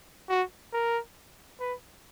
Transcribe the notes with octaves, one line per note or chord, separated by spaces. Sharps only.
F#4
A#4
B4